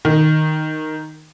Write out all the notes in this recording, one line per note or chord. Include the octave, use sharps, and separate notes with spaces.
D#3